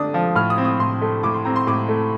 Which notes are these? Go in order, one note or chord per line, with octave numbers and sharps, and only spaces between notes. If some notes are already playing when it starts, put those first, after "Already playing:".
Already playing: D3 A3 D4 D#6
F3
A2 F6
D#6
C4
D#6
A2 C6
A3
A2 D6
C6
C4 A#5
C6
A2 D6
A3